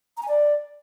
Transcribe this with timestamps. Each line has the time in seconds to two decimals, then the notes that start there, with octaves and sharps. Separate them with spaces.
0.17 A#5
0.23 G#5
0.28 D5